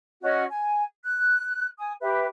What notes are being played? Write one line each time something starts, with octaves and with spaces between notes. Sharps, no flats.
C#4 F#4 D#5
G#5
F#6
G#5 D#6
G4 B4 E5